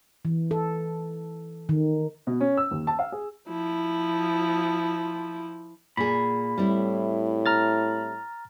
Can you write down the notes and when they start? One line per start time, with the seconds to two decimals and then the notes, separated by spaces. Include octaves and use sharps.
0.25 E3
0.51 A4
1.69 D#3
2.27 B2
2.40 C#4
2.57 E6
2.71 D#2
2.87 A5
2.99 F5
3.12 G#4
3.49 F3 E4
5.97 A#2 G#4 B5
6.58 A2 G3 C4 E4
7.46 A#5 F6 A6